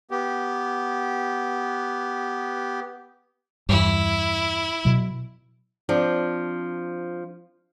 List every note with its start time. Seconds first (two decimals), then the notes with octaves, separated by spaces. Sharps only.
0.11 B3 G4
3.69 E2 G2 E4
4.85 B2 F#3
5.89 F3 C4 D4